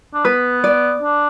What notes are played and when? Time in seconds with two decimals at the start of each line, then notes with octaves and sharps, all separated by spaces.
0.14 D4
0.25 B3 B4
0.64 D5
1.02 D4